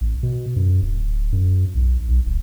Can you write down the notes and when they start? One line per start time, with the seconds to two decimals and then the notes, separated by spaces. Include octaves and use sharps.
0.01 A1
0.23 B2
0.56 F#2
0.82 D1
1.32 F#2
1.75 B1
2.08 B1
2.26 D1